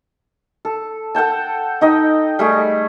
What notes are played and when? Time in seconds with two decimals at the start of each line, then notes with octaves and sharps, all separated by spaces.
0.65 A4
1.15 A4 F#5 G5 A5
1.81 D#4 D#5 G5
2.39 G3 A3 G#4